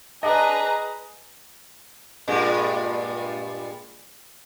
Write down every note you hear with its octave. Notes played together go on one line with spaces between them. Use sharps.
D4 G#4 B4 D#5 A#5
G2 A#2 G#3